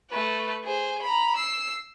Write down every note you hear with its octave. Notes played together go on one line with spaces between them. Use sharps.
A3 B4
G#4 C5
A#5 B5
E6 C7